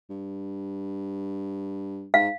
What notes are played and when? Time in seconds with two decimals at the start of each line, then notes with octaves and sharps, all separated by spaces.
0.10 G2
2.14 G#2 F5